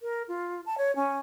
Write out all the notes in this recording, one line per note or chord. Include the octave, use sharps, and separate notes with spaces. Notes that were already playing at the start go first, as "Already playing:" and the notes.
A#4
F4
A5
C#5
C#4